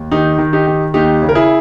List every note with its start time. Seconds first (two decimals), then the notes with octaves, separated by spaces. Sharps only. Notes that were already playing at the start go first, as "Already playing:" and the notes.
Already playing: D#2
0.12 D#3 D#4 G4
0.38 D#3
0.53 D#4 G4
0.67 D#3
0.94 D#2 D#4 G4
1.22 C#3
1.29 A#4
1.35 E4 G#4